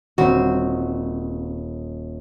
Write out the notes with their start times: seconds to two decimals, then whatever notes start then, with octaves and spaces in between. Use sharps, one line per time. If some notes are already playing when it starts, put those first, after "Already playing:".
0.18 D#1 C4 F#4